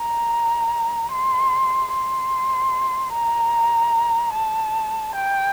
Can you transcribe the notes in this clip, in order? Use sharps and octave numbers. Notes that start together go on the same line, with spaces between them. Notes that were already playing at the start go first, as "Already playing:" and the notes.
Already playing: A#5
C6
C6
A#5
A5
G5